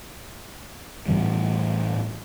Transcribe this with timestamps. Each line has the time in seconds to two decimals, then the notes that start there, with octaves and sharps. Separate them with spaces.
1.08 A2 E3 G3